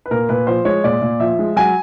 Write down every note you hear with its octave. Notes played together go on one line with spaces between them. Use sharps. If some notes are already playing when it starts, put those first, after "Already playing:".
B4
A#2 A#4
A#2 B4
F3 C5
G#3 C#5
A#2 D5
A#2
F3 E5
G#3
F#3 G#5